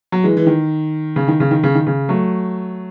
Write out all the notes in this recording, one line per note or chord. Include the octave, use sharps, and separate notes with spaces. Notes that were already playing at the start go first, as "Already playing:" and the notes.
F#3
E3 G#3
E3
D#3
C#3
D#3
C#3
D#3
C#3
D#3
C#3
F#3 A3